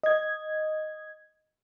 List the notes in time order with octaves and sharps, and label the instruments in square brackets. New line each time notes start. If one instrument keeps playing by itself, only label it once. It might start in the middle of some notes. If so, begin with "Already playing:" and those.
[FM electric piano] D#5 G#6